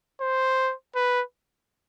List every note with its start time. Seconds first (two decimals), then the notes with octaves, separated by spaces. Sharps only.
0.21 C5
0.96 B4